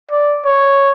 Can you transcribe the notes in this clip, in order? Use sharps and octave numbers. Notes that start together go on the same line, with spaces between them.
D5
C#5